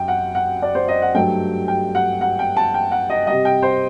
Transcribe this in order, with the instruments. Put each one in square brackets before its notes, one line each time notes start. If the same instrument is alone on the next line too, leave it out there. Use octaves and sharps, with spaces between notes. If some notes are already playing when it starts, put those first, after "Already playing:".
Already playing: [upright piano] F#2 F#3 G5
F#5
F#5
D5
C5
D#5
F#5
G2 F#3 A3 G5
G5
F#5
F#5
G5
A5
G5
F#5
D#5
G3 D#5
C3
G5
C5